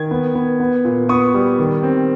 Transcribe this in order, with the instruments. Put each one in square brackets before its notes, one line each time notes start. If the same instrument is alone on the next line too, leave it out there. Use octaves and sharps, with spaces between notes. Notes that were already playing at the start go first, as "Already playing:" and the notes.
Already playing: [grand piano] D#3 G#6
B3
B3
B3
A#2
B3 C#6 D#6
G3
D#3
C4